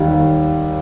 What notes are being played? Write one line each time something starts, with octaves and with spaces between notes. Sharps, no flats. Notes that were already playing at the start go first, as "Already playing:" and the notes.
Already playing: D#2 D#3 G3
D#2